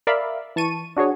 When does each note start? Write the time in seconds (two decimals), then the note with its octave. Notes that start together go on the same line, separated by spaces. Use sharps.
0.07 A#4 D5 E5 F5 B5
0.56 E3 A5 C#6 D#7
0.97 D4 F#4 G#4 C#5